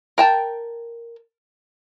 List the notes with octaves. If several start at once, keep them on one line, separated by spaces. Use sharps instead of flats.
A#4 G5 A5